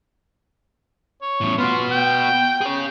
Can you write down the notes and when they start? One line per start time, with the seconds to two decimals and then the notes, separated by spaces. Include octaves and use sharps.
1.22 C#5
1.41 E2 A2
1.58 B3 F4 F#4
1.91 G5
2.61 G#4 C#5